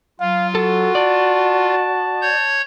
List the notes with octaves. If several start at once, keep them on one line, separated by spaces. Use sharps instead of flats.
F#3 F4 F5
F#4 A4
D5 A5
C#5 G6